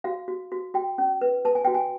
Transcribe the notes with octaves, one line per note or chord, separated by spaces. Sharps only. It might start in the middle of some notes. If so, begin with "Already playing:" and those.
F#4 F5
F#4
F#4
F#4 G5
C#4
B4
B4 A5
G#5
F#4 G5
G#5